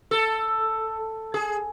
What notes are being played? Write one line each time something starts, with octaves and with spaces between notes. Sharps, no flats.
A4
G#4